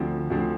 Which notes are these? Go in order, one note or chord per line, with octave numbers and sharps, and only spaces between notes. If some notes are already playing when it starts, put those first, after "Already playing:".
Already playing: D2 D3 F3 C4
D2 D3 F3 C4